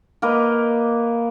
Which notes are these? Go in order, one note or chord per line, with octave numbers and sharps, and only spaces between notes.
A#3 A#4 B4 D#5